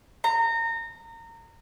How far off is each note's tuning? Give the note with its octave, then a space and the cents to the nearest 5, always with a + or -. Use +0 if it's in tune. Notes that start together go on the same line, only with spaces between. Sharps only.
A#5 -25